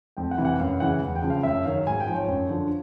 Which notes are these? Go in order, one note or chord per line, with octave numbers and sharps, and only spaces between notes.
F2 G5
F#5
C3 E3
F#5
F#2 F5
C#3 E3 F#5
E2
G5
C#3 F3
F5
F#2 E5
D#3 F#3 F5
G#2 G#5
G5
F3
C#5
F#2
D3 F3